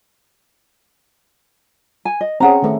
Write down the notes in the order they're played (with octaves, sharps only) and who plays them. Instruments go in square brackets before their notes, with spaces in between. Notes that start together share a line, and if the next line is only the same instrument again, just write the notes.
[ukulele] G#5
D#5
[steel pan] C4 C#4 G#4 [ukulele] F#5 A#5
[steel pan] D#3 A3